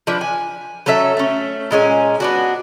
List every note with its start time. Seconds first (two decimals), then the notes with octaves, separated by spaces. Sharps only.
0.07 F3 D4 B4
0.21 G#5
0.86 F#3 C#4 A4 E5
1.17 A3 C#4
1.71 A#2 G#3 C#4 G#5
2.20 B3 D4 F#4